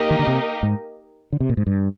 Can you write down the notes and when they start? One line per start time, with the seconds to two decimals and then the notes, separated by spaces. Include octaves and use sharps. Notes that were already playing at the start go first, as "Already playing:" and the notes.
Already playing: A#3 D#4 G4 A#4 D#5
0.11 D#3
0.19 D3
0.27 C3
0.63 G#2
1.33 D3
1.40 C3
1.49 A#2
1.57 G#2
1.67 G2